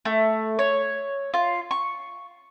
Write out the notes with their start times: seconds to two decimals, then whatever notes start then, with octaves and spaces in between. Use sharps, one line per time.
0.05 A3
0.59 C#5
1.34 F4
1.71 C#6